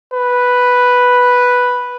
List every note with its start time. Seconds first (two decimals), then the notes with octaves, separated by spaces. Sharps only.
0.14 B4